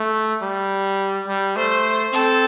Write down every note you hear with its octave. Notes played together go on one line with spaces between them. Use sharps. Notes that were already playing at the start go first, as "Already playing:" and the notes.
Already playing: A3
G3
G3
A3 C5
C4 A4